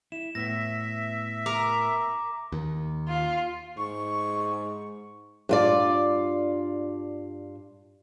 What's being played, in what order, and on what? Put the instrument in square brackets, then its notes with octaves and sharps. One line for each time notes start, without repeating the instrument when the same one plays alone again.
[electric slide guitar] E4 [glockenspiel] E7
[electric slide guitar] A2 B3 [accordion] E5 [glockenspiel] A#6
[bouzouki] A#4 [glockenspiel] D6
[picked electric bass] D#2
[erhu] F4
[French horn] G#2 [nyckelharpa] C#6
[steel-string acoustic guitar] G2 F4 D5